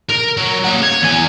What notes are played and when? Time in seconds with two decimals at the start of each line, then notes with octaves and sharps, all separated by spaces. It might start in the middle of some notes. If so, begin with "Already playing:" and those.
0.09 A#4
0.37 F#3
0.64 A#3 F#5
0.83 C#5
1.02 E2 G#5